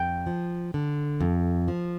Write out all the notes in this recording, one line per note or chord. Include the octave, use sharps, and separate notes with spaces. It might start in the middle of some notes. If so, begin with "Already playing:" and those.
Already playing: F2 G5
F3
D3
F2
F3